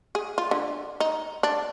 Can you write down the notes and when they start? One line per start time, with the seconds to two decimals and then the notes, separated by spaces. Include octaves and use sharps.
0.15 G#4
0.38 F4
0.51 D3
1.00 D#4
1.43 D4